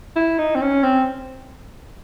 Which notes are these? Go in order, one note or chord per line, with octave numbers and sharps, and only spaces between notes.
E4
D#4
C4
C#4
C4